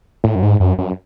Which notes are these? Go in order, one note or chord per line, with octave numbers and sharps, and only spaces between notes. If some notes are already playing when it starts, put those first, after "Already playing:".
A2
F#2
G#2
F#2
F#2